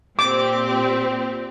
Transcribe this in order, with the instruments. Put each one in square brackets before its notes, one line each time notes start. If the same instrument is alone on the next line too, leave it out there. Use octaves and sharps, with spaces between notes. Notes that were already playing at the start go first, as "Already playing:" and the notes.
[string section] A#2 C4 G4 [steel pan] D6